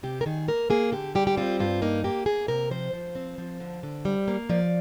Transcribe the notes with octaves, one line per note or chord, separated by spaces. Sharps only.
C3 G4
A#4
D#3 G#4
A#3 A#4
A#3 G#4
D3 G4
G3 G4
G4
C4 F4
G2 F4
A#3 D#4
A#3 G4
A#3 G#4
C3 A#4
F3 C5
F3
C4
F3
D3
D3
G3
A#3
F3 D5